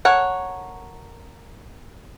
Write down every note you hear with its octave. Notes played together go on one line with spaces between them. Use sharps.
A4 A#4 C#5 F#5